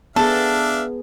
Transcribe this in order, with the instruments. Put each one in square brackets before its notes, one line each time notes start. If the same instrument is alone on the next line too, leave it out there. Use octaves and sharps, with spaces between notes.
[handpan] B3 G#4 [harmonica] D4 E5 F5 [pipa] A4